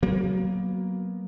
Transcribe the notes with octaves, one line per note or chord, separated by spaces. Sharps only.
F#3 A#3 B3